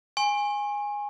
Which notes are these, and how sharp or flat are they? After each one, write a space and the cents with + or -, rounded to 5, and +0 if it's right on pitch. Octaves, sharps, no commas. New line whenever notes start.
G#5 -10 C#6 -45